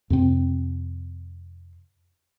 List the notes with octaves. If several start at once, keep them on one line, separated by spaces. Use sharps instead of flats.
F2 C3 C4